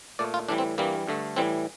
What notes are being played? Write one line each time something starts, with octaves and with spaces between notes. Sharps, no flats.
A#2 A3 D5
F4
A2 E3 G3 D4
C4
G2 E3 G3 A#3
G2 D3 A3
A2 E3 G3 C4